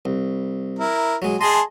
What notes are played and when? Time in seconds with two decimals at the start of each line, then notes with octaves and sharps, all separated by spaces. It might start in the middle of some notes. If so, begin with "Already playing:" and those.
0.05 C2
0.79 E4 A#4
1.22 F#3 G#3
1.41 G#4 D#5 A5 C6